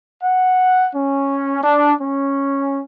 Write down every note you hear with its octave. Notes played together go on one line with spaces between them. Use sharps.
F#5
C#4
D4
C#4